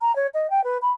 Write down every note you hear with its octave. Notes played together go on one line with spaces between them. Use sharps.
A#5
C#5
D#5
G5
B4
B5